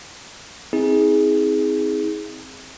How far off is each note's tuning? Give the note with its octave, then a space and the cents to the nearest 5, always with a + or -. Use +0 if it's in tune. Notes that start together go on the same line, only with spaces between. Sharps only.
C4 +0 D#4 +45 G#4 +0